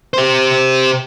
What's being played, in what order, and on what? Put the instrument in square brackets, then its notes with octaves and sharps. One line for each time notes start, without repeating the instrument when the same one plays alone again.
[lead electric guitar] G4 C5